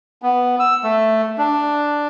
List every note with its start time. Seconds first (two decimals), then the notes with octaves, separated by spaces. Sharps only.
0.22 B3
0.59 E6
0.83 A3
1.38 D4